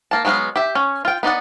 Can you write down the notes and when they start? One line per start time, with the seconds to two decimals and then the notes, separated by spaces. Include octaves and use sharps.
0.11 A#3 A5
0.25 F#3 G#3 B3 E4 F5
0.56 G4 E5
0.75 C#4
1.05 F4 G5
1.23 B3 D#4 D5 F#5